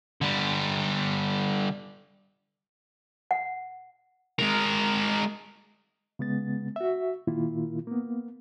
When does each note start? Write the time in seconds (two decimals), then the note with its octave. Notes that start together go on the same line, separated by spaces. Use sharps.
0.21 D3 G3
3.31 F#5
4.39 G#3 A#4
6.19 C#3 G#3 B3 A6
6.76 F#4 E5
7.27 A#2 D#3 A#3 E4 F4
7.87 A#3 B3